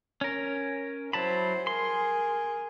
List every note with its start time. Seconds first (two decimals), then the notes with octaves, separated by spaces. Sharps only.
0.21 C#4 A#4
1.13 F#3 E4 C5 A5 B5
1.67 G#4 A#4 C6